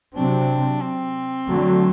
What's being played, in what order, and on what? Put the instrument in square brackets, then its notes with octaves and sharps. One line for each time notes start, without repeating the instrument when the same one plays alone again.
[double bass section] C3 F#3 C4 [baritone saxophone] D4
[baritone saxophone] C4
[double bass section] D3 F#3 A3